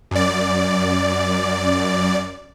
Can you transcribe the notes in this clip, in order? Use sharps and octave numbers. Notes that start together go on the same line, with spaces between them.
F#2 D5